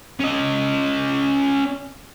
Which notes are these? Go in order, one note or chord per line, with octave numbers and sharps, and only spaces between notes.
C#4 D#5